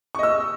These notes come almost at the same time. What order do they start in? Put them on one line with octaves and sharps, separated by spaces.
C#6 D#5 E6